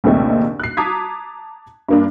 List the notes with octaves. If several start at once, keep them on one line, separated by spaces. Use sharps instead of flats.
A#1 D#2 C3 G#3 A3 D#4
F#6 C7
A5 A#5 D6 D#6 G#6 B6
G2 A#3 D4